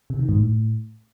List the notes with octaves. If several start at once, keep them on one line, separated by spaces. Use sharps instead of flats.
C3
D#3
G#2
A2